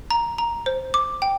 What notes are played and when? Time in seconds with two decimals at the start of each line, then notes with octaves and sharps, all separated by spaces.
0.11 A#5
0.38 A#5
0.66 C5
0.94 D6
1.22 G5